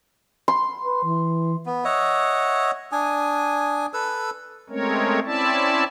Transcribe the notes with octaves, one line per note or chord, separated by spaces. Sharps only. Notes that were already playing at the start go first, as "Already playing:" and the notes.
C6
B4
E3
B3
C#5 D#5 E5 F#5
D4 G#5 D#6
A4 B4 E6
G#3 A3 C4 C#4 A#4 C#5
C4 C#4 E4 D5 E5 A5